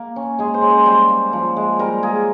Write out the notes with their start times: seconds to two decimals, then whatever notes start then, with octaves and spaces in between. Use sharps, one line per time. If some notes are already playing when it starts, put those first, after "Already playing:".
Already playing: A#3
0.16 C#4
0.39 G#3 G#4
0.54 C5
0.62 C#4
0.70 C5
0.86 G3 C5
1.09 A#3
1.33 F3
1.57 G#3
1.79 G3 A#4
2.03 A#3 G#4